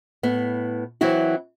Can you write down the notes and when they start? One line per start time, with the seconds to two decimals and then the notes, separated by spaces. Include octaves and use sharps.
0.23 A2 B3
1.01 E3 F#3 C4 E4 F#4